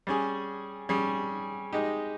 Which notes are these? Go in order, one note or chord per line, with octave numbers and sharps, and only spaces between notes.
G3 C#4 G#4
G3 C#4 G#4
G#3 D#4 G4